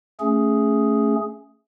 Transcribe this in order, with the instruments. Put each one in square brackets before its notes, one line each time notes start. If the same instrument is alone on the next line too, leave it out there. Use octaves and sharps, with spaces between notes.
[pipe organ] A3 C#4 G#4